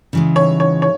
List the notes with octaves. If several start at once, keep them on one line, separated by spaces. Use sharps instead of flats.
C#3 E3 G#3
C#5
C#5
C#5